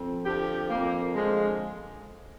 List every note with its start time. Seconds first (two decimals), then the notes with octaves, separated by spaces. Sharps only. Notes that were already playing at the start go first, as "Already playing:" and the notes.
Already playing: F2
0.25 D3 F3 G4
0.70 F2 A#3
1.15 D3 F3 G#3